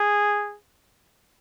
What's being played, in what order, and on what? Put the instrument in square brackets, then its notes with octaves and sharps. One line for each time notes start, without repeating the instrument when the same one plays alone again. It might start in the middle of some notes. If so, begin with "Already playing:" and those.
Already playing: [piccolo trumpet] G#4